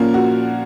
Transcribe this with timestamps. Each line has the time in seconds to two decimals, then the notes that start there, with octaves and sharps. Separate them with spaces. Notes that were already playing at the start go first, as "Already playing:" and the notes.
Already playing: A#2 F3 A#3 C#4 F4
0.14 F#4